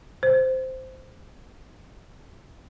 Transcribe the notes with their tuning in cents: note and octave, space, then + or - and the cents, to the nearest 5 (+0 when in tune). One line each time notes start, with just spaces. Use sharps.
C5 -5